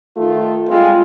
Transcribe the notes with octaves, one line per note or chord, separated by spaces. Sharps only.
D#3 A3 F4
G3 G#3 C4 F4